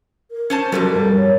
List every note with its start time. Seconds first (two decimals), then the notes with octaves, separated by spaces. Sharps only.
0.31 A#4
0.50 C#4 C5 A5
0.72 F2 B2 F#3 G3 A4
0.95 G2
1.17 C#5